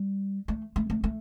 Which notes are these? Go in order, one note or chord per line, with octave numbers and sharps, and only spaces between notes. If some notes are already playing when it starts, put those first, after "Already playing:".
Already playing: G3
A3
A3
A3
A3